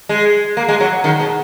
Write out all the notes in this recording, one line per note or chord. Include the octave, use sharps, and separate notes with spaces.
G#3
A#3
G#3
F#3
D#3
B2